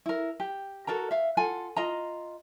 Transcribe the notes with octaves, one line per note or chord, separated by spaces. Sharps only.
E4 A#4
G4
F#4 A4 A#4 A#5
E5 F5
F4 A4 F#5 G#5
F4 D#5 A#5